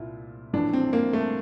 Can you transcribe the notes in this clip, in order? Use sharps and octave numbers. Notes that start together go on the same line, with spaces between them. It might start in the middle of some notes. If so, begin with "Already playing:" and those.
Already playing: C2 A#2 E4 F4
A#1 A2 E3 D4
C4
A#3
A3